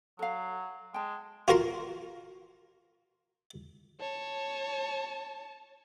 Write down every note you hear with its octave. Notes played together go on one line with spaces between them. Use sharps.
F#3 A4 F5
G#3 G5 A5
F4 F#4 A#4 A#5 C6
C#5 A5